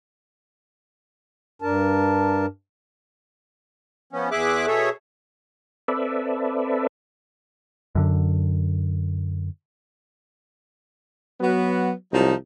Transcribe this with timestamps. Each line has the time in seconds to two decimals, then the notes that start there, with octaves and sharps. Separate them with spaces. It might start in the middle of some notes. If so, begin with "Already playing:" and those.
1.62 G2 D4 A#4 A5
4.13 F3 B3 C#4
4.31 E2 G#4 E5 D6 F#6
4.67 B2 G#4 A4 C#5 E5
5.88 C4 A4 B4 D5 E5
7.95 F#2 D3
11.41 F#3 B3 F#4
12.13 C2 F3 F#3 D#4